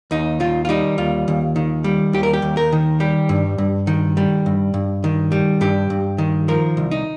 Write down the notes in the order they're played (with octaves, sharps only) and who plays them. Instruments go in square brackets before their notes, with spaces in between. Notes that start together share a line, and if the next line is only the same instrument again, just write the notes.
[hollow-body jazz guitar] D#2 D#4
D#3 F4
F4
G3 D#4
D#2 F4
D#2
D#3
G3
D#2 G4
A#4
G4
D#2
A#4
D#3
G3 G4
G2
G2
D#3
G3
G2
G2
D#3
G3
G2 G4
G2
D#3
F3 A#4
C2
D#4